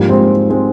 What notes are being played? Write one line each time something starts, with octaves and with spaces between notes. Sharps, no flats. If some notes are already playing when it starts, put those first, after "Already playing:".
Already playing: G#2 F3 G3 A#3
G#3 C4
G#3 C4